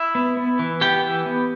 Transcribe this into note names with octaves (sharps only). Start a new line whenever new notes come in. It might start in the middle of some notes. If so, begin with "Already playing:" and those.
Already playing: E4 E5
B3
B3
E3
B3 G4 G5
E3
B3